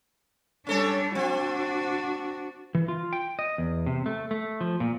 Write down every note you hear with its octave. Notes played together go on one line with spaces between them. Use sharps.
G3 C#4 D4 A4 C#5
C4 D4 F#4
E3
F4
G5
D#5
E2
C3
A3
A3
F3
A#2